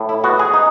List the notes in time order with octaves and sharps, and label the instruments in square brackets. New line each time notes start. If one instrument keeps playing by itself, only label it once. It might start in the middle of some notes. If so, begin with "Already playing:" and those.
Already playing: [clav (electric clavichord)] A2
E4
B3 F#4
G#4
D#4